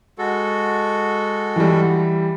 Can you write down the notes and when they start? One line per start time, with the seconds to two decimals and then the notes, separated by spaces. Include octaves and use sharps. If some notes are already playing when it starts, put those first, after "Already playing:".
0.18 G#3 F#4 A4
1.56 E3 G3